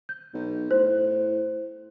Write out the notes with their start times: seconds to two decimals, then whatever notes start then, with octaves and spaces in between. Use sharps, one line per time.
0.09 G6
0.34 B1
0.71 A2 C5